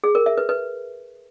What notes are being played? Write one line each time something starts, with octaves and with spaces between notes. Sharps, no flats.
G#4
A#4
E5
B4
B4